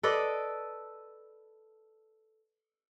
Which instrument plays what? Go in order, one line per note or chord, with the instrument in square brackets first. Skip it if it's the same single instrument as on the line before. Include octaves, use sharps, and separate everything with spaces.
[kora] A4 B4 D5 D#5